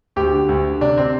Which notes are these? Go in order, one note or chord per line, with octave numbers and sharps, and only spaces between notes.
D2 G4
D3
D2
D3
C3 D4
C4